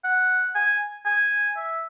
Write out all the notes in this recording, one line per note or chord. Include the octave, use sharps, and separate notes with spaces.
F#5
G#5
G#5
E5